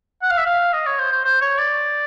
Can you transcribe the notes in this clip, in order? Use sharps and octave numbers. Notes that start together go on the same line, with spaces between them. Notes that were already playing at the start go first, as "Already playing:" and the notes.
F#5
F5
E5
F5
D#5
C#5
C5
C5
C5
C#5
D5